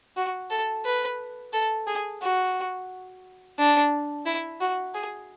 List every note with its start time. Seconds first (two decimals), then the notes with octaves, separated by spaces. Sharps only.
0.17 F#4
0.50 A4
0.85 B4
1.52 A4
1.87 G#4
2.22 F#4
3.58 D4
4.26 E4
4.60 F#4
4.94 G#4